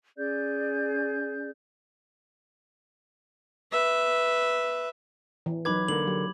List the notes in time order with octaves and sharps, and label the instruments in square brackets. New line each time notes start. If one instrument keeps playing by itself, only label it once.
[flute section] C#4 G#4 D5 G6
[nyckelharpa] B4 E5
[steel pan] E3
[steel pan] F#3 D#4 B4 [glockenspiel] B5 D6 G#6
[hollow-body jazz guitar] D3 A#3 [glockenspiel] F#7
[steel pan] F#3 G4